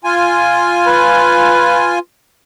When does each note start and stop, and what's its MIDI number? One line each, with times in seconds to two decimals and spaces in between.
0.04 1.99 65
0.04 1.99 80
0.87 1.98 71